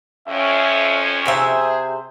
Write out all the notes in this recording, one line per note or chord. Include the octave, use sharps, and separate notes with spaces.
F2 C#4 E5
C3 G#4 C5 E5